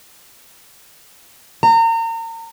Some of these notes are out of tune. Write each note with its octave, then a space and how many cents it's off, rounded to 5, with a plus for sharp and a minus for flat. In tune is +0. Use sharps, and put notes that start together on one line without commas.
A#5 -35